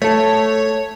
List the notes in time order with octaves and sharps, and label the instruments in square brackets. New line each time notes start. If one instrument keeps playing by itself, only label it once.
[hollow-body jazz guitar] A3 A4 [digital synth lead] C#5